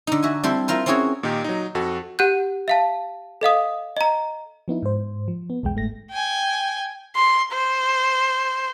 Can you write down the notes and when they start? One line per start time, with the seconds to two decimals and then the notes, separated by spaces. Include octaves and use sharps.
0.07 D3 D#4
0.23 F#4 E5 G#5
0.44 G3 C4 E4 A4 C5
0.68 E4 F4 A#4 C5
0.86 C4 C#4 E4 F#4 G#4 C#5
1.23 A#2 D#3 D#4 G4
1.44 F#3 D#4
1.75 F2 F#4 A4
2.19 G4 F#5 F#6 G6
2.68 E5 F5 A5
3.41 A4 D#5 F5 D#6
3.97 D#5 A#5
4.68 F3 B3 D#4 E4
4.83 G#2 C5
5.28 F3
5.50 B3
5.63 B1 E2 G#3 G5
5.75 G1 G#2 A3 A#6
6.11 G5 G#5
7.16 C6
7.52 C5